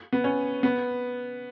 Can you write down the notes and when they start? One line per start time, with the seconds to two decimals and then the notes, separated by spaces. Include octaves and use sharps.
0.13 B3
0.24 C#4
0.63 B3